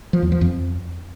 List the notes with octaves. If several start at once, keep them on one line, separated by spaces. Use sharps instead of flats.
F3
E2
F3
F2